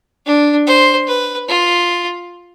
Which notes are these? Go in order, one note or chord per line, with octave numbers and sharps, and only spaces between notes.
D4
C5
B4
F4